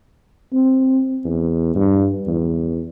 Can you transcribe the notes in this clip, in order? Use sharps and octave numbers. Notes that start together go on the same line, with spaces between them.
C4
E2
G2
E2